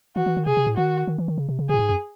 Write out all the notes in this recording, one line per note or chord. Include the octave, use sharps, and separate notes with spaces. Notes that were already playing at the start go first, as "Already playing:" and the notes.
E3 F#4
E3
D#3
C3 G#4
C3
A2
D#3 F#4
D#3
E3
D#3
C#3
C3
C#3
A2 C3 G#4
G#2
F#2